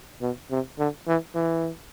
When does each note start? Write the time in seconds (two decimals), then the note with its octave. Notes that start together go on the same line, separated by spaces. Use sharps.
0.21 B2
0.51 C3
0.79 D3
1.08 E3
1.35 E3